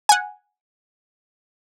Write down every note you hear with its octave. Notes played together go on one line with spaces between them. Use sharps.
F#5 G#5